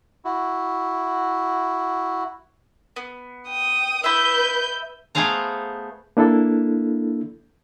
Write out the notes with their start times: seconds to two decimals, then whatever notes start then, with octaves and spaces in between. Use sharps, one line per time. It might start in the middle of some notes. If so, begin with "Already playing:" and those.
0.25 E4 F#4
2.96 B3
3.49 G5 D#6
4.04 E4 B4 D#5 E5 G6
5.15 A3 B3 G#4 C5 F5 A#5
6.17 A#3 D4 E4 A4